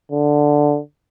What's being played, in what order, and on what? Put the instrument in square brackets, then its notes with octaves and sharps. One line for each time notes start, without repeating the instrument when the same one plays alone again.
[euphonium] D3